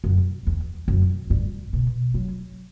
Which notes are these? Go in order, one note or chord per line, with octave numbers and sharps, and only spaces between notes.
F#2
E2
F#2
G2
B2
F#3